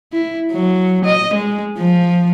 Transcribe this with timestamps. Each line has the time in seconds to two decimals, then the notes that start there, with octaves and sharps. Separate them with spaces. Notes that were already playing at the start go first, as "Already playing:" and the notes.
0.12 E4
0.52 F#3
1.05 D#5
1.34 G#3
1.78 F3